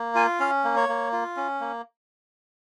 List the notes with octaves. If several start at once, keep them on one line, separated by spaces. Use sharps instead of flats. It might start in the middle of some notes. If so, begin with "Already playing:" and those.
Already playing: A#3
F4 G#5
C#4 F5
A#3
C#5
A#3
F4
C#4
A#3